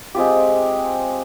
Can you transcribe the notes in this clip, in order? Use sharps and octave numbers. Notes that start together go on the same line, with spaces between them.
G#3 C4 F4 G4